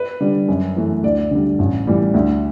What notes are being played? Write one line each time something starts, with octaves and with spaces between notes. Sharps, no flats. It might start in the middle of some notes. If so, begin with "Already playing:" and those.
Already playing: B4
D3 G3
F#2
E3 A3
D2 D5
D3 G3
A1
A2 E3 G3
D2